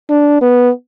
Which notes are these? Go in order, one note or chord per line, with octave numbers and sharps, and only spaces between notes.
D4
B3